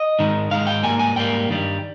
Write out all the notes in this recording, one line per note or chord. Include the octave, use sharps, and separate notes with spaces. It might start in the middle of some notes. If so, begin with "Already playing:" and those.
Already playing: D#5
G#2 D#3 G#3
G#2 D#3 G#3 F5
G5
G#2 G3 A#3 G#5
G#5
G#2 G3 A#3 G5
G2 D#3 G3